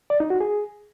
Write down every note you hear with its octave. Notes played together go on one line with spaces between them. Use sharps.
D5
D#4
F#4
G#4